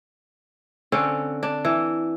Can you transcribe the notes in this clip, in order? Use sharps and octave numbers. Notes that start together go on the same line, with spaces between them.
D3 C4 C#4
D4
E3